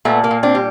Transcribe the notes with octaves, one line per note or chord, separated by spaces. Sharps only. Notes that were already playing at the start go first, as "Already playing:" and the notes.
A#2 A3 B3
A#3
A#2
C4 D4
G3